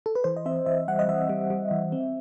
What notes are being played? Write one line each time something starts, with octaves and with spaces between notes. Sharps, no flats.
A4
B4
E3 C5
D#5
C4 E5
E3 E5
G3 F#5
D#5
E3 E5
G3
G3
E3
C4